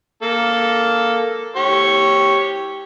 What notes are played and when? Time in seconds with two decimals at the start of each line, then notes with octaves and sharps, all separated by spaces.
0.23 A#3 A4
1.56 G4 C#5